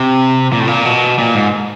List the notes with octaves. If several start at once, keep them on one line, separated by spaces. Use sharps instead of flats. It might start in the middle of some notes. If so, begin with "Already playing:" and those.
Already playing: C3
A#2
A2
A#2
B2
A#2
G#2